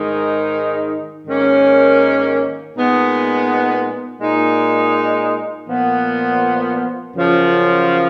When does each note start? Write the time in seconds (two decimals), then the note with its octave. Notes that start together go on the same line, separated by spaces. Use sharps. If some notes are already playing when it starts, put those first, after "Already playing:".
Already playing: G#2 D#3 G#3 D#4
1.26 G#2 D#3 A#3 C#4
2.74 A#2 G#3 B3 D#4
4.21 A#2 G#3 D#4
5.68 A#2 F3 B3
7.15 F#2 C#3 F3